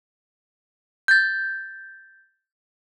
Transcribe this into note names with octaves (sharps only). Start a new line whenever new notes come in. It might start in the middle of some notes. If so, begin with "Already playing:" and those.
G6 A6